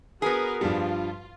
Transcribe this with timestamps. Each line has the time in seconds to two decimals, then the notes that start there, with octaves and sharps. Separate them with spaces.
0.22 B3 F#4 G#4 A#4 B4
0.61 G2 F3 G3 F4